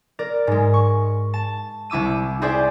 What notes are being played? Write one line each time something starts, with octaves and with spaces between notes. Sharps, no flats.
A#4 D5
G#2 G#3
C#6
A5
C2 E4 D6 E6 D#7
E4 G4 G#4 C5 D5